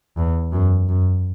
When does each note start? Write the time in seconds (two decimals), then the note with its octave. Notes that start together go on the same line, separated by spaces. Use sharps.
0.17 E2
0.52 F#2
0.89 F#2